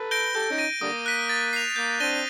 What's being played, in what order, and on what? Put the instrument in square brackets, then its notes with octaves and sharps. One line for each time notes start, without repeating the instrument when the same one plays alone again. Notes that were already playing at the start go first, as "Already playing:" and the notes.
Already playing: [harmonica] A4 B4
[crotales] G6 A#6 D7 G7
[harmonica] G4 A4 [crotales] G6
[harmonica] C#4 D#4
[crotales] A#6 D#7
[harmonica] D3 G3 A#3 [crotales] D#6
[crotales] F#6 B6 D#7
A6
C7 F7
[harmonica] A#3 [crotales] G6
[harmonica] C4 D4 [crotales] A#6 D#7 G7